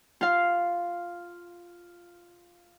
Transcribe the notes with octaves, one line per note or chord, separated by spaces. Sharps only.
F4 F5